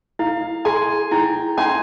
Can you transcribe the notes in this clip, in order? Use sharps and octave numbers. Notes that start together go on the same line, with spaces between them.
E4 F5
G#4 G#5 C6
E4 G5 A#5
C#4 G#5 C6